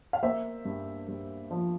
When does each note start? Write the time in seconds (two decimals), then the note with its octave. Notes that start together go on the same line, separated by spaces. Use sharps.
0.13 F5
0.23 A#3 C5 E5
0.65 G2
1.08 G2
1.51 F3